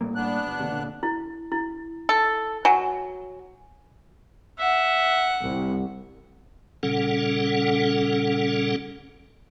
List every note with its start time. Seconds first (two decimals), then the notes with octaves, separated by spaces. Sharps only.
0.01 A2 G3 A#3
0.15 B3 D4 F#6
0.47 F#1
0.60 F#1 D#2 C3
0.72 A#2 D3
1.03 E4
1.52 E4
2.09 A4
2.65 F#3 G#5
4.59 E5 F#5
5.44 C2
6.83 A#2 C#3 G3 C#4 A4 F#5